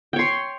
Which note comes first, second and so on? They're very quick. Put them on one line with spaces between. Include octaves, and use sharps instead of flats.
G5 C#5 C6